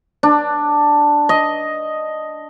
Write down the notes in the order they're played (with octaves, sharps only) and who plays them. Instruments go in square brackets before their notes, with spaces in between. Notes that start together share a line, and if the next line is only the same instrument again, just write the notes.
[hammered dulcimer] D4
D#5